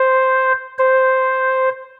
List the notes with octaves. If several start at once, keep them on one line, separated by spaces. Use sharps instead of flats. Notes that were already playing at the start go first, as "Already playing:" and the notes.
Already playing: C5
C5